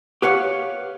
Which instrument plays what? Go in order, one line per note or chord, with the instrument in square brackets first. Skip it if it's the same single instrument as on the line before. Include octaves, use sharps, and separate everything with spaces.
[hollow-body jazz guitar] G4 B4 C#5 F5 F#5